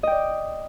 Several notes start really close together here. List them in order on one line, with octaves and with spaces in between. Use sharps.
D#5 G5 D5